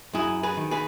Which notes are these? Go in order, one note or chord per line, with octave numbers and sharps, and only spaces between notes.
F#2 E4 G#4
G#4 B4
D#3
G#4 B4